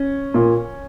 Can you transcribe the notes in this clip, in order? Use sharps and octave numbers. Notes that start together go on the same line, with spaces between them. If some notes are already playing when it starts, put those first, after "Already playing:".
Already playing: C#4
A#2